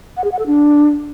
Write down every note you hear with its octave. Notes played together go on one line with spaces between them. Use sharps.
F#5
G#4
F#5
A4
D4